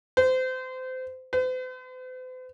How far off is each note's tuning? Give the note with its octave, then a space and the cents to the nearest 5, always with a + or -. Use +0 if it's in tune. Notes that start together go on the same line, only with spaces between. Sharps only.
C5 -25
C5 -45